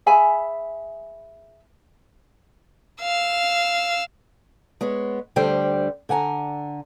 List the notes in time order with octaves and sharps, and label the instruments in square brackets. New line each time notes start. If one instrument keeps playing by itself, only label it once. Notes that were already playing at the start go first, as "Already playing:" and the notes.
[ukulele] G#4 E5 G#5 B5
[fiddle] F5 E6
[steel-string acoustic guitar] G#3 B3 C#5
D2 D3 G3 C5 G5
D3 F#5 G#5 A#5